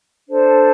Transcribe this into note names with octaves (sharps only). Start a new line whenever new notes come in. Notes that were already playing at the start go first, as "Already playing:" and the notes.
D4 A4 C5